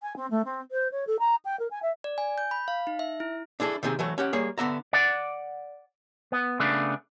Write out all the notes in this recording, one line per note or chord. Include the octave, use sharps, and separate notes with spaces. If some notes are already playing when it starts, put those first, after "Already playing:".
G#5
C4
A3
C4
C5
C#5
A4
A#5
G5
A#4
G#5
E5
D5
G#5
G6
B5
F5
D#4
E5
E4
D4 E4 G#4 A4
C3 D#3 C4 G#4
E3 F#3 A3
C#4 G4 F#5
G3 A#3 G#4 C#5
D3 B3 E5 A#5
D5 F#5
B3
C#3 A3 B3 D4